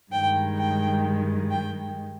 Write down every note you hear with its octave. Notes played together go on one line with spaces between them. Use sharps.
G2 D#3 G#3 G5
G5
G5